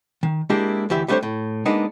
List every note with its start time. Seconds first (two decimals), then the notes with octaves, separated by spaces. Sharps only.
0.23 D#3
0.50 G#3 A#3 D4 E4 G4 A#4
0.90 D2 E3 G4 E5
1.08 G3 A3 B3 D4 C5 C#5
1.23 A2
1.66 G#3 A#3 B3 D4 D#4